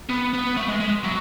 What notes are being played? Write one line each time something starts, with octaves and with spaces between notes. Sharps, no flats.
B3
B3
A3
G#3
G#3
F#3